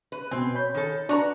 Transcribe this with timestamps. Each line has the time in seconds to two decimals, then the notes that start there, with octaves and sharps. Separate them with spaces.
0.12 B4
0.31 B2 C4 G#5
0.55 C#5 B5 G6
0.74 D#3 A4
1.09 D4 F#4 B4 A#5